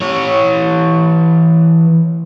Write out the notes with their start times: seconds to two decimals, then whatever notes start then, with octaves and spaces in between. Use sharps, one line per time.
0.01 E3 C#5